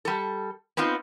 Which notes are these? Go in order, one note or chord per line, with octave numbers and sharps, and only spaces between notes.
G3 A4
B3 C4 D#4 F4